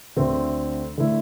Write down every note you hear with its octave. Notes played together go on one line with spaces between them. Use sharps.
D2 D3 A3 C4
D3 A3 E4